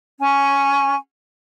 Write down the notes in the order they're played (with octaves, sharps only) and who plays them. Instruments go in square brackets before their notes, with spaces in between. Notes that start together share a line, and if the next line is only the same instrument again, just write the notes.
[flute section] C#4 G#5 C#6